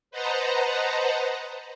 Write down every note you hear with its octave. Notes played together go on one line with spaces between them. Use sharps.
B4 C5 D#5 F#5 A5 A#5